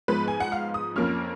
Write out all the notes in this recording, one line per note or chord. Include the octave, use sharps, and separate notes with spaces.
G#2 F3 G#3 B3 B4
G#5
F#5
F5
D#6
F2 F3 A#3 C#4 F6